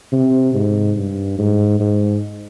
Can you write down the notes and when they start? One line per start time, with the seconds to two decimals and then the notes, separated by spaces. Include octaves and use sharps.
0.12 C3
0.54 G#2
0.97 G2
1.38 G#2
1.80 G#2